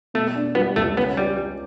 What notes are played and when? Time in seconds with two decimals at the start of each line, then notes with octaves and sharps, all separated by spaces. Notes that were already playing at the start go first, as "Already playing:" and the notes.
0.14 B2 A3
0.35 D4
0.55 G3 B3
0.76 C#2 A3
0.97 B3 C#4
1.17 G3 G4